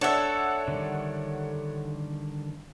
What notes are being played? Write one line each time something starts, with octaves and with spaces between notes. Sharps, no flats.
D4 A4 C#5 E5 F#5
D3 D#3 G3